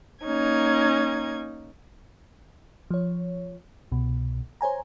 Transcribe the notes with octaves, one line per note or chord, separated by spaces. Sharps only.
A#3 C#4 D#4 G#6
F3 C#5
C2 B2
C5 C#5 G#5 A#5